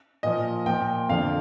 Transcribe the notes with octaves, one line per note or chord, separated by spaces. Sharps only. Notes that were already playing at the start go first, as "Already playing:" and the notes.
A#2 F3 D#5
A#2 F3 G5
F2 D3 F3 F5